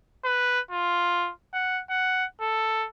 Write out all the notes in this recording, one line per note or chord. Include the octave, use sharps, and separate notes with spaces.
B4
F4
F#5
F#5
A4